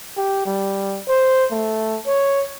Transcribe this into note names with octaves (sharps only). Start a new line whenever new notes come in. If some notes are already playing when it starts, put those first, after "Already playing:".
G4
G3
C5
A3
C#5